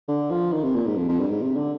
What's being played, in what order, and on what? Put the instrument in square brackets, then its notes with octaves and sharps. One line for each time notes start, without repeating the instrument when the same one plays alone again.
[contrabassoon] D3
F3
D#3
C3
A#2
G#2
F2
F2
G2
G#2
C3
D3